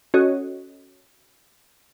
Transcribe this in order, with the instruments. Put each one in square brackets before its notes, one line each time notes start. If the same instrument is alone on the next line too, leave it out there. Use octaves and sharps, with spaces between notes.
[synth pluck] C#4 F#4 A4 C#5 D#5